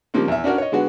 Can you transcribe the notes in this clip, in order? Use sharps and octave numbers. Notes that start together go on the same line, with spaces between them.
C#3 F3 G3 A#3 C4
E2 E5
C#4 D4 F#4 A#4
C#5 D#5
D3 G#3 B3 F#4